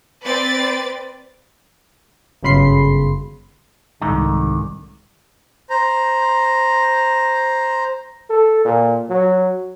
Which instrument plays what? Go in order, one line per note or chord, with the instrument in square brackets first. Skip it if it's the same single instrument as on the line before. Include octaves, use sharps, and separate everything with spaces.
[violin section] C4 B4 D5 A6
[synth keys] G1 F#2 C#3 B5 C6 C7
[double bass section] C2 [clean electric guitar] G#2 D3 D#3
[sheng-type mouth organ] C5 A#5
[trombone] A4
A#2
F#3